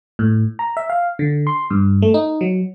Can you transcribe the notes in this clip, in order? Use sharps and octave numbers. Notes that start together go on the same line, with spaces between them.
A2
A#5
E5
F5
D3
C6
G2
A3
D#4
F#3